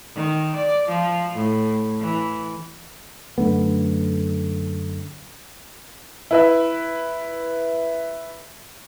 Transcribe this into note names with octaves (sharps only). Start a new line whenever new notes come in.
D#3
D5
F3
A2
E3
F#2 D3 A3 B3
E4 B4 E5